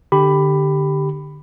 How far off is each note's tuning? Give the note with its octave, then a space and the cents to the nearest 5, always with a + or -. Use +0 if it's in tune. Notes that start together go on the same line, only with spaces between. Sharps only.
D3 +15 G4 +0 B5 +10